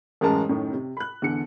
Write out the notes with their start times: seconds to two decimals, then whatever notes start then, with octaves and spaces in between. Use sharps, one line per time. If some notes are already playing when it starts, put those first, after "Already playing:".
0.21 A1 F#2 G#3 A#4 A5
0.49 F#2 A2 D#3
0.73 C3
0.97 B5 F#6
1.22 E2 D3 C#7